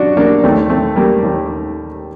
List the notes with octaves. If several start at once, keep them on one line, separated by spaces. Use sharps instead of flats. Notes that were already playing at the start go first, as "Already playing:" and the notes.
Already playing: F#2 D4 F#4
A#3 D4
D#2 D#3 A3 C4
A3 C4
G3 A#3
D#2 D#3